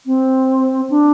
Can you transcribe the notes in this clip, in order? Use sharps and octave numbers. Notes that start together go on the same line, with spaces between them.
C4
D4